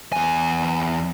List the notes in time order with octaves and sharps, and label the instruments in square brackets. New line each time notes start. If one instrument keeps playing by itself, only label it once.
[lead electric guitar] E2 G#5